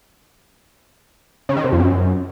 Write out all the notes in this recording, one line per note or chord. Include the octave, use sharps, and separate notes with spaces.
C#3
D#3
C3
F2
F#2